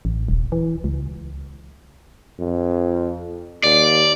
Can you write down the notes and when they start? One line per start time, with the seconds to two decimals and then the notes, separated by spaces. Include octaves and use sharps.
0.05 A1
0.28 D#1
0.52 E3
0.84 C#2
2.39 F2
3.64 D#2 D5